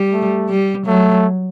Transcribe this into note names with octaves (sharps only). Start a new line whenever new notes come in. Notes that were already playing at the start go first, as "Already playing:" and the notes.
Already playing: G3
A3
G3
F#3 A3